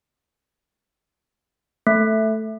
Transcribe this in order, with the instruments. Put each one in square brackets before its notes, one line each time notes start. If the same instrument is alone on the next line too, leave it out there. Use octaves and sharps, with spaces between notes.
[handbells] A3